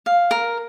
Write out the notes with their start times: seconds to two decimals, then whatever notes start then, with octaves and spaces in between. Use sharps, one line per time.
0.06 F5
0.31 A#4